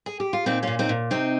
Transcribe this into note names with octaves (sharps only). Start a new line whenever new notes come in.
G#4
G4
F4
A#2 C4 D#4
A#2 C#4 F4
C4 D#4
A#2
C3 C4 D#4